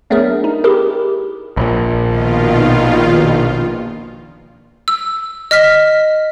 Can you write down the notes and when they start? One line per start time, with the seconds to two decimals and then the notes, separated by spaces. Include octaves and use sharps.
0.10 F#3 A3 B3 D4 G#4 A#4
0.44 D#4
0.64 E4 G4 G#4 A#4
1.57 A#1 A#2
2.05 B2 D#3 F4
4.88 E6
5.51 D#5 F6 B6